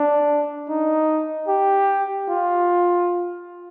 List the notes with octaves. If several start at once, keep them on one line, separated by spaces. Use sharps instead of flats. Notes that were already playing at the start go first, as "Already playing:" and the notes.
Already playing: D4
D#4
G4
F4